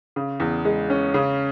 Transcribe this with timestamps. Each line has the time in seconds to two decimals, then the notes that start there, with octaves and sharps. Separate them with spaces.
0.16 C#3
0.40 E2
0.65 G#3
0.90 C#4
1.14 C#3